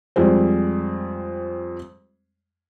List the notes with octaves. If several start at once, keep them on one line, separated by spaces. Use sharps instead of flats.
F2 G3 G#3 C4